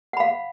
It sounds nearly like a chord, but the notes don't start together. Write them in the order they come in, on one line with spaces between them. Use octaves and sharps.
F#5 B5 F5